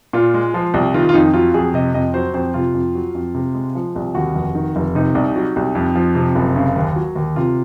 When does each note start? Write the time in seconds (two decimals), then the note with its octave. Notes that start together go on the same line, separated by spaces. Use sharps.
0.13 A#2 F4
0.34 G#3
0.54 F3
0.74 C2
0.94 D#3 F4
1.09 F4
1.14 F2 D#4
1.34 F#3 F4
1.54 F2 G#4
1.74 C3 D#5
1.94 F2 D#5
2.14 F#3 C5
2.34 F2 C5
2.54 C3 F4
2.74 F2
2.95 F#3
3.15 F2
3.35 C3
3.55 G#3
3.75 F3
3.96 C2
4.15 D#2 F#4
4.36 F1
4.55 D#3
4.76 F1
4.95 C3 D#4
5.15 C2
5.36 F#3
5.56 C2
5.75 F2
5.95 F3
6.15 C3
6.35 F#1
6.56 C#3
6.76 D#2
6.96 F#3
7.16 D#2
7.36 C3 F4